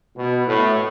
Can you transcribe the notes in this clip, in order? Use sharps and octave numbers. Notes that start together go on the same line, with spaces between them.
B2
A2